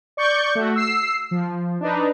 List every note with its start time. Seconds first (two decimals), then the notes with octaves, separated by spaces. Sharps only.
0.17 D5 C#6 G6
0.55 A3 F#4
0.76 E6 C7
1.31 F3
1.81 D4 D#4 B4